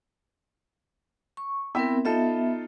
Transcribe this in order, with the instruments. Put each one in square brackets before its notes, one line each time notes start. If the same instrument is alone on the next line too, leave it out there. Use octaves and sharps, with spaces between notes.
[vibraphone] C#6
[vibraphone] B3 C4 A#4 [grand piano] E4 E5 G5
[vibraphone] B3 E5 [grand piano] D#4 F4 A4